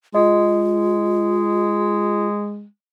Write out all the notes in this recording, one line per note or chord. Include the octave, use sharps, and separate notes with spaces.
G#3 F4 D#5